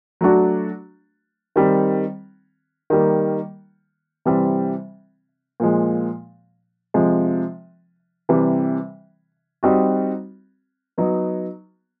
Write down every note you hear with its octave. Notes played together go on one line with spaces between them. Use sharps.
F#3 A3 D4 F#4
D#3 G3 C4
D#3 G3 A#3
C3 E3 G3 C4
A#2 F3 G#3
C3 F3 G#3
C3 E3 G3
G3 C4 D#4 F#4
F#3 B3 D#4